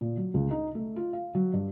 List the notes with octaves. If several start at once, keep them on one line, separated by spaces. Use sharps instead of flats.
A#2
F#3
C#2
D#4
A3
F4
F5
F#3
G2